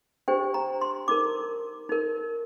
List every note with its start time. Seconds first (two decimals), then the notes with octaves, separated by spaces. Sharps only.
0.28 D4 G4 C5 G5
0.54 A#5
0.81 C6
1.08 D#4 A#4 D6
1.89 D#4 A#4